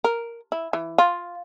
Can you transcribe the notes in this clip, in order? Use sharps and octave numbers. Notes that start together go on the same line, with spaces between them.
A#4
E4
E3
F4